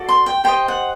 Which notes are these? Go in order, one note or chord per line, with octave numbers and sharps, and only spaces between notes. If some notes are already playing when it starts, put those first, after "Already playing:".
Already playing: F#4 A4 D5
C6
G5
G4 C5 D#5 G5
F#5